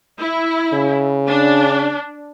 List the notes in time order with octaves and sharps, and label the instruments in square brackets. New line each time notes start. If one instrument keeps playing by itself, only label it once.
[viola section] E4
[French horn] C#3
[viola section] D4